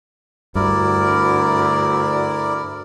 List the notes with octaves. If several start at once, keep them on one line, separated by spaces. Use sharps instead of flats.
D2 G2 E4 A#4 D5